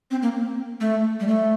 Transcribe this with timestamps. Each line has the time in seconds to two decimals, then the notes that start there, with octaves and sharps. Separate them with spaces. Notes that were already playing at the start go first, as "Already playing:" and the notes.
0.11 C4
0.22 A#3
0.81 A3
1.20 G3
1.28 A3